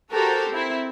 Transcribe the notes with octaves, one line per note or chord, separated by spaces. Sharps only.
F#4 G4 A4 A#4 C5
C4 E4